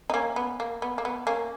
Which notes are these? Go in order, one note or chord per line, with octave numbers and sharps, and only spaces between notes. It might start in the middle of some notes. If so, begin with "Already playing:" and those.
D#4
A#3 C#4
B3
A#3
B3
A#3
B3
A#3 C#4